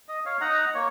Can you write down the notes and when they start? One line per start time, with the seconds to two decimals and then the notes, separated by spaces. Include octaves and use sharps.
0.08 D#5
0.26 C#5 F5
0.41 D#4 D#5 F#5 A#5
0.74 A#3 C#5